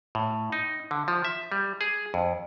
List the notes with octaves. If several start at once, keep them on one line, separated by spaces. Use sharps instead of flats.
A2
D#4
D3
F3
E5
G3
G#4
F2